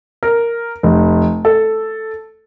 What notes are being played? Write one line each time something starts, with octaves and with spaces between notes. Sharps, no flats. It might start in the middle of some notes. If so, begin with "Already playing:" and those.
A#4
F1
A4